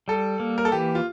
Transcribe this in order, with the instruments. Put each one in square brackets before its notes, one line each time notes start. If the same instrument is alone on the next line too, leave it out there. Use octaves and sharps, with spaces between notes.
[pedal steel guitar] G3 [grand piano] A4
[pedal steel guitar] A#3
[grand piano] A#4
A4
[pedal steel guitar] E3 [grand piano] G4
[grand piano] F4